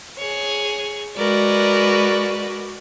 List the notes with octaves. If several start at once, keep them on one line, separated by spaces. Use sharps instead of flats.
G#4 C#5
G#3 F#4 A#4 B4 D5